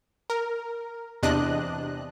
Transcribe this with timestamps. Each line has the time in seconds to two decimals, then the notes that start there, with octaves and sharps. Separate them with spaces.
0.30 A#4
1.23 E2 C3 D4 D#5 F#6